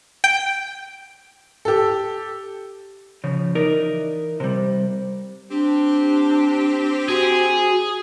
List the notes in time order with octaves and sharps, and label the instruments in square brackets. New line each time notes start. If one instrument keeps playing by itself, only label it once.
[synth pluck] G5
[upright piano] G4 A4
[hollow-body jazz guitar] C#3 F3
E3 D#4 A#4 D5
C3 G3
[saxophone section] C4 G4 [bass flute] D4
[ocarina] F#4 [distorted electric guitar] G#4